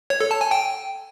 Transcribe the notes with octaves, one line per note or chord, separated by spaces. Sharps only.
C#5
A4
A5
G#5
G5